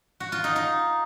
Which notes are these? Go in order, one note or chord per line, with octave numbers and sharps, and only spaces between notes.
F#4
F4
D#4
D#4